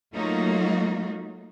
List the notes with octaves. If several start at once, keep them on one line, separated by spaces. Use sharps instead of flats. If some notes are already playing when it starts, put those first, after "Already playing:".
F#3 A3 A#3 D#4 F4 F#4